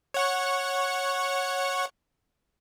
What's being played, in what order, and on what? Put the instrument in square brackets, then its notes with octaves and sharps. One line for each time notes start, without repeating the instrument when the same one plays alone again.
[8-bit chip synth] C#5 F#5 C#6